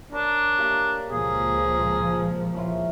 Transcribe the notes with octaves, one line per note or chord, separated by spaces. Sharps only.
D4 A#4 C#5
A#3 G4
C#2 A#2 F3 A#3 G#4
A#5
C#4 E4 F4